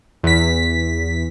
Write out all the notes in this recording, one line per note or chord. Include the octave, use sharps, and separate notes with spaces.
E2 B6